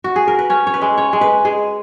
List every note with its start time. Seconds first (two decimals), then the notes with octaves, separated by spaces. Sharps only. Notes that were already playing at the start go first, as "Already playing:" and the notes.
0.04 F#4
0.16 G#4
0.28 A#4
0.39 B4
0.50 C#4 C#5
0.67 C#5
0.74 B4
0.82 G#3
0.98 C#5
1.13 G#3
1.21 B4
1.45 G#3 G#4